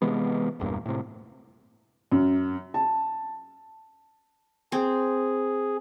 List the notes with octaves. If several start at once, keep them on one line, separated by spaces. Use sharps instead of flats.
C3 E3 G#3 B3
G1 E2 G2 A#2
A2 C3
F#2
A5
C4 G#4